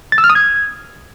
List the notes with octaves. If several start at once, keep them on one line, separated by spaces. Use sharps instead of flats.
A6
E6
F6
D#6
G#6